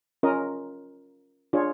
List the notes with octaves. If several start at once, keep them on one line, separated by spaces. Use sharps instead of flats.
C#4 F4 A#4 D#5
D4 F4 G#4 C#5